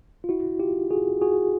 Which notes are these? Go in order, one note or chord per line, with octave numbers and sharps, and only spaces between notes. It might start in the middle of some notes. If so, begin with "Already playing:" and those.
F4
E4 F#4
F4 G4
F#4 G#4
F#4 G#4